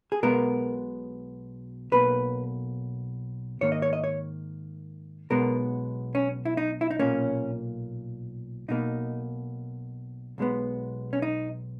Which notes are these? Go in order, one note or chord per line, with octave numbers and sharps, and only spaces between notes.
G#4
B1 B2 G#3 B3 A#4
B1 B2 A#3 B4
G#2 D#3 A#3 C#5
D#5
C#5
D#5
C#5
B1 B2 G#3 B3 A#4
C#4
E4
D#4
E4
D#4
B1 A#2 A#3 C#4
B1 B2 A#3 D#4
B1 B2 G#3 B3
C#4
D#4